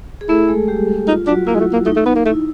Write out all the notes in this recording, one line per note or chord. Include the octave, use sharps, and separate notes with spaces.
G#4
A3 E4 A4
G#3 G#4
G3 G4
D#4 F4
F#3 D4 F#4
A#3 E4
G#3
A3
A#3
A3 D#4
A3
B3
A#3
A3 E4